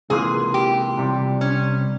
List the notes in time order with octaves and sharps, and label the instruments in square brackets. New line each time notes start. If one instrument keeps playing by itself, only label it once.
[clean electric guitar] C#2 C3 E3 A#3 F4 [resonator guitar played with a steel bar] G#4
[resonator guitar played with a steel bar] G4
[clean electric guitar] C2 C3 G3
[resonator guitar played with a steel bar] C#4